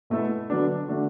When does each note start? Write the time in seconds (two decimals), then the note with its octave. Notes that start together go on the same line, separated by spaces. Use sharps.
0.10 B2 A3 E4 A4
0.50 D3 F#3 B3 D4 F#4
0.88 D3 A3 D4 F#4